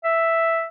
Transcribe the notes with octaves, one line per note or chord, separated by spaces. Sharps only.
E5